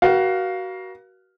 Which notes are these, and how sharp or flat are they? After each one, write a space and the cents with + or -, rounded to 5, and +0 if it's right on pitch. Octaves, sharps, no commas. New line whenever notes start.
F#4 +20 A#4 +45 F5 +5